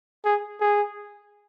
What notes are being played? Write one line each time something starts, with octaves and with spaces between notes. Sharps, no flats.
G#4
G#4